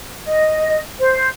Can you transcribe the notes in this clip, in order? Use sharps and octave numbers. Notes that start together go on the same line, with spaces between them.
D#5
C5